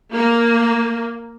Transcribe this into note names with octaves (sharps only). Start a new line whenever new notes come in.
A#3